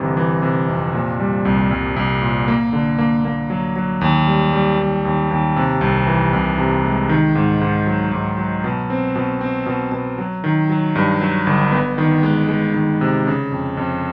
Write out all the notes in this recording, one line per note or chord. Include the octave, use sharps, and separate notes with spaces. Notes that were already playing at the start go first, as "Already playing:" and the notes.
Already playing: G1 C3 E3
E3
C3
F2
A#2
G3
C2
C2
C2
A#2
A#3
D3
A#3
A#3
F#3
F#3
D#2
G3
G3
D#2
D#2
D#2
C3
C2
E3
C2
C3
G#3
D#3
G#2
G#2
F#3
G#2
F#3
B2
C4
B2
C4
B2
B2
F#3
D#3
F#3
G2
F#3
G1
B3
D#3
G#3
G#3
D#3
C3
C#3
F2
F2